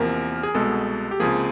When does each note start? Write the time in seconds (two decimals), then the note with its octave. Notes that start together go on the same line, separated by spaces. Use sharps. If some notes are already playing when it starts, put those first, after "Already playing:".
Already playing: E2 C3 F3 A#3 A#4
0.43 G#4
0.54 C2 B2 G#3 B3 A4
1.11 G4
1.20 C#2 C3 F3 A#3 G#4